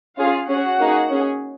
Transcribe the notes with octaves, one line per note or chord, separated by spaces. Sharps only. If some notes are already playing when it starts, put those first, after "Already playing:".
C#4 F4 G#4 F5
C#4 F#4 G#4 F#5
A#3 D#4 G#4
C#4 G#4